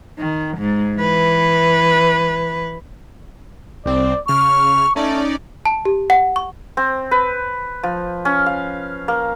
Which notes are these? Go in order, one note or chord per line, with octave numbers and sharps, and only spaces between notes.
D#3
G#2
E3 B4
C2 C4 D5
C#3 C#6 F6
A3 C#4 D#4 D5
A5
G4
F#5
C#6
C4
B4
F3
C#4
F5
A#3